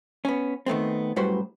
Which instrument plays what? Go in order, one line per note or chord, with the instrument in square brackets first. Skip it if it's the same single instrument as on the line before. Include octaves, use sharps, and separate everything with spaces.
[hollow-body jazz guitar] B3 C#4
D#3 A3 B3 C4
F#2 A2 G3 F#4 B4 C5